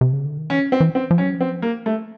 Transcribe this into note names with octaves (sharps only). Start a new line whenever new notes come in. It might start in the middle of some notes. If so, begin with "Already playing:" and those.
C3
C#3
D3
D#3
E3 C#4
C4
E3
C4
F3
C#4
F#3
F3
C4
A#3
A3